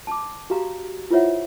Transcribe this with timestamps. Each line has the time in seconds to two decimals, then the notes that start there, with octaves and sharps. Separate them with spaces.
0.07 A5 D6
0.50 F#4 G4 F5 A#5
1.11 E4 F4 C5 C#5 E5 F#5